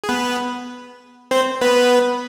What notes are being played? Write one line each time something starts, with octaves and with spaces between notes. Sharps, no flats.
G#4
B3 B4
C4 C5
B3 B4